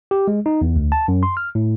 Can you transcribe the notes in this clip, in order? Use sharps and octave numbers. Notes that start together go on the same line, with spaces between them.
G4
G#3
D#4
E2
D2
A5
F#2
C6
F6
A2